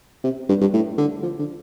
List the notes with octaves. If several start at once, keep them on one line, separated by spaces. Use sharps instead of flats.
C3
G2
G2
A2
D3
F3
D3